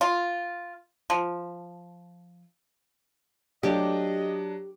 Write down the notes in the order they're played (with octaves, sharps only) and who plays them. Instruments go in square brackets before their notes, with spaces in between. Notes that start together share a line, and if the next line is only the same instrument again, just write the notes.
[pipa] F4
F3
[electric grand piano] F#3 D4 [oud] G4 [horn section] D#5